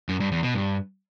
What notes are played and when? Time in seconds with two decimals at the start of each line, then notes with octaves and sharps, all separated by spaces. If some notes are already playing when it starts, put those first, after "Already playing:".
0.09 F#2
0.20 G2
0.32 E2
0.43 B2
0.55 G2